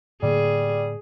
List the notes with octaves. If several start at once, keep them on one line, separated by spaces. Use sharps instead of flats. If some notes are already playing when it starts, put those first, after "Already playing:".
A2 D3 G3 A#3 G#4